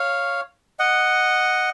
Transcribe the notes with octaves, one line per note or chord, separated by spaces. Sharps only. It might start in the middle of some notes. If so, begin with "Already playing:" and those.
Already playing: C#5 F5
D#5 F#5